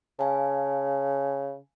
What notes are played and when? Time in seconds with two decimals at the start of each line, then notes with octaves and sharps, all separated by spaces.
0.19 C#3 F5 G#5 A5